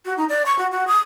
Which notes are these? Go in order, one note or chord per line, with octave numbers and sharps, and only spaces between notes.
F#4
D#4
D5
C#6
F#4
F#4
D#6